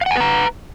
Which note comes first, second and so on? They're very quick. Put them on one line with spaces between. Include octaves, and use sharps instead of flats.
F5 F#5 G#5 B4 A#5